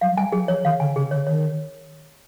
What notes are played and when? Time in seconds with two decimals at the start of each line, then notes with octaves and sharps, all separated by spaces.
0.01 F#3 F5
0.12 F#3
0.17 G3 G#5
0.32 F#3 G#4
0.48 F3 C#5
0.64 D#3 F5
0.80 D3 G#5
0.96 C#3 G#4
1.11 D3 C#5
1.27 D#3 C#5